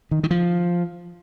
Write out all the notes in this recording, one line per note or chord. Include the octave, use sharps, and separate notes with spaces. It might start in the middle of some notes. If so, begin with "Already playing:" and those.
D#3
D#3
F3